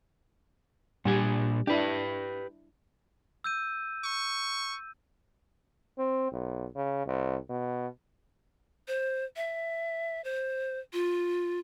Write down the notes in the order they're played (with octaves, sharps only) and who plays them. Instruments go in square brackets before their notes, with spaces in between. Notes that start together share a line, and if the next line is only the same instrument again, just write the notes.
[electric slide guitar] A#2 D4 G#5 [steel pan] G3
[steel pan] D4 E4 [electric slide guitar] G4 B4
[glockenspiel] E6 G6 D#7
[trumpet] C#6 [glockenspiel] E6
[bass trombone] C4
B1
C#3
C2
B2
[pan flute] C5
E5
C5
F4